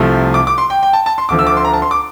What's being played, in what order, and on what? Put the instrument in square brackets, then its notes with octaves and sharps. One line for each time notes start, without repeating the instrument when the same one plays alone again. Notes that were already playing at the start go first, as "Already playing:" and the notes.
Already playing: [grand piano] C2 C3 F3 A3
D6
D6
C6
G5
G5
A5
A5
C6
D2 D3 F3 D6
E6
D6
C6
A#5
A5
C6
D6